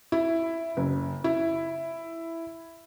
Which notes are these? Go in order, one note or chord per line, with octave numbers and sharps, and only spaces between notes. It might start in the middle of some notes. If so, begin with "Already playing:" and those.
E4
F#1
E4